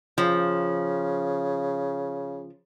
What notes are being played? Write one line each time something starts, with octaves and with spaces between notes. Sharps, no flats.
C#3 F3